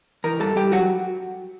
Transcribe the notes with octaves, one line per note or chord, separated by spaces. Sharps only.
E3 A#4 A#5
G2 A4 A5
G2 G4 G5
F#3 F#4 F#5